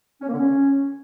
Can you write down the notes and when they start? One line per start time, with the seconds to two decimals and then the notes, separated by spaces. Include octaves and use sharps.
0.21 C#4
0.27 A#3
0.33 D3
0.38 C#4